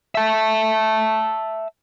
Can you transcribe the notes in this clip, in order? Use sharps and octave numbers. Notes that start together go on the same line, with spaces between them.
E5 A5